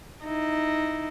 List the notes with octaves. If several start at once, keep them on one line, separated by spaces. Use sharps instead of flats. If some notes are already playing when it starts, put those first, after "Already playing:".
D#4 E4